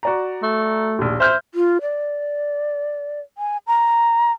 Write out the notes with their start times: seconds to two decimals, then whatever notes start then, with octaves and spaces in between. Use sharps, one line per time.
0.03 F#4 D5 A#5
0.43 A3
0.99 A#1 D#2
1.20 C5 E5 F6 G6
1.55 F4
1.82 D5
3.38 G#5
3.67 A#5